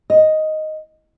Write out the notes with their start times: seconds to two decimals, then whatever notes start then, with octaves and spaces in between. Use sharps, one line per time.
0.10 D#5